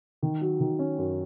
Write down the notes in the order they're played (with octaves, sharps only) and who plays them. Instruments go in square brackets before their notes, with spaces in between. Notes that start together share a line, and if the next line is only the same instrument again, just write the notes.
[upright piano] D#3
F#3
D#3
C#4
F#2